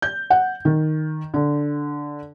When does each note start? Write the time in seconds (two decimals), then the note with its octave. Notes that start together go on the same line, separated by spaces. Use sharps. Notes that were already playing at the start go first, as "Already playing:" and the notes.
0.02 G6
0.30 F#5
0.65 D#3
1.34 D3